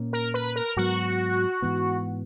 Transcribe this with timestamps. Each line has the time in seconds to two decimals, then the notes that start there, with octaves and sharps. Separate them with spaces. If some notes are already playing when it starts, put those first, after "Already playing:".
Already playing: A#2 A#3 C#4
0.13 A#4
0.34 B4
0.56 A#4
0.76 G#2 F#3 B3 F#4
1.62 G#2 E3 B3